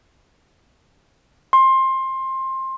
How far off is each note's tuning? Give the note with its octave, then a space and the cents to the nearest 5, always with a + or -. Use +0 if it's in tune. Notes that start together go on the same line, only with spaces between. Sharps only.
C6 +20